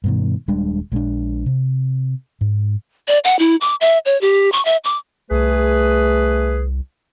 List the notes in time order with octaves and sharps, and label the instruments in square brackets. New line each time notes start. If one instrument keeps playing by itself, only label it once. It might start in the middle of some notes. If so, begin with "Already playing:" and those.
[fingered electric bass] G2 B2 D#3
D#1 G3 G#3 D4
A#1 G#3 C4 D4
C3
G#2
[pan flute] D5
F#5
E4
D6
E5
C#5
G4
C#6
E5
D6
[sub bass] C2 [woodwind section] A3 G#4 B4